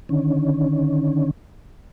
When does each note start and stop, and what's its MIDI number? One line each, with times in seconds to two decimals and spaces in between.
0.09 1.31 50
0.09 1.31 51
0.09 1.31 61